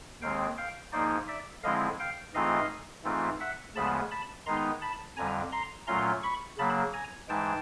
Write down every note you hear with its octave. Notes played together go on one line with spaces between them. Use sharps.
D#2 D#3 G#3 C4 F5 G5
F5 G5
G#2 F3 A#3 D#4 C5 D5
D5 E5
D3 F3 G#3 C4 E4 D#5 F5
F5 G5
G#2 E3 A3 C4 F4 D#5 F5
G#2 E3 A3 C4 F4
E5 F#5
D2 C#3 F3 G#3 B3 A5 B5
A5 B5
D#3 G#3 B3 D#4 A#5 C6
A5 B5
F2 D3 G3 G#5 A#5
A#5 C6
A#2 F#3 A3 C#4 F4 A#5 C6
B5 C#6
C#3 F#3 A#3 A5 B5
G#5 A#5
G#2 E3 G#3 G5 A5